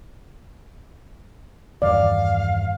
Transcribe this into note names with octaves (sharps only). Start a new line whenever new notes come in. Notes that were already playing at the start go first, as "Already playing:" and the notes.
E2 G2 D#3 D5 F5